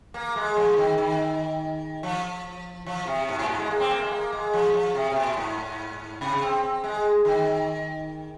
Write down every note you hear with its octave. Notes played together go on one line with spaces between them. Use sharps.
A#3
G#3
F3
D#3
D#3
F3
F3
C3
G#2
A#2
G#2
G#3
A#3
C4
A#3
G#3
A#3
G#3
F3
F3
C3
C3
A#2
G#2
C3
C4
C4
G#3
D#3